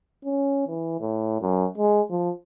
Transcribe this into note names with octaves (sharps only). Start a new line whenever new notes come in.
C#4
E3
A2
F#2
G#3
F3